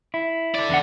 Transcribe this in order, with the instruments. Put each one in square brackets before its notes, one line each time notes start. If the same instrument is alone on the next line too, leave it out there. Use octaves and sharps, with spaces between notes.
[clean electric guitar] E4
[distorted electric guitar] A4 D5
[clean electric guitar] E2 D4 F#5